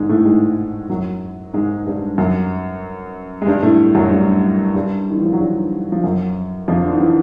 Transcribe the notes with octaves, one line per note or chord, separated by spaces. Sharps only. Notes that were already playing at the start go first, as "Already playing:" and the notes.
Already playing: G#2 D3 D#3 G#3
A2 A3
G#2 G#3
F#2 F#3
G#2 G#3
G2 G3
F#2 F#3
G#3
G2 G3
A2 A3
F#2 F#3
G2 G3
G2 G3
D#3
E3
F3
F#3
G2 G3
F3
F#2 F#3
F2 F3
D3
D#3
E3